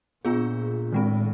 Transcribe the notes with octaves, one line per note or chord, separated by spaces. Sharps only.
A#2 B3 D4 F4 G#4
A2 D#3 G#3 C4